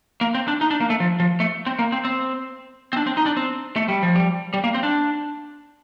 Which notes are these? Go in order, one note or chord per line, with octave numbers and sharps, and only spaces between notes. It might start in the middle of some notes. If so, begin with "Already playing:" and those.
A#3
C4
D4
D#4
D4
A#3
A3
F3
F3
A3
C4
A#3
C4
C4
C4
D4
C4
D#4
D4
C4
A3
G3
F3
G3
G3
A#3
C4
D4